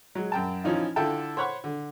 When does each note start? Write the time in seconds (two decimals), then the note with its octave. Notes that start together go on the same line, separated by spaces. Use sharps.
0.15 F#3 G#3
0.32 F#2 G5 A5
0.64 E3 F3 C#4 D#4 F4
0.96 D3 E4 F4 A4 G5 A5
1.37 C5 C#5 F#5 B5 C#6
1.64 D3